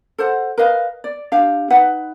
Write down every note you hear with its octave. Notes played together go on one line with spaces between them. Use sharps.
A4 C5 F#5
A#4 B4 D#5 F5
D5
D4 G4 F5
D#4 B4 E5 F#5